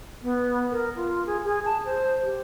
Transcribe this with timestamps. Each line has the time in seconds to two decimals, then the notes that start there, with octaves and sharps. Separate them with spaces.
0.22 B3
0.71 A#4
0.96 F4
1.26 G#4
1.45 G#4
1.65 A5
1.85 C5
2.23 G4